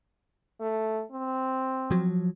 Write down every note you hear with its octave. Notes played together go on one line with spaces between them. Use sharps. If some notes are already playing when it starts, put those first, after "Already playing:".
A3
C4
F3 F#3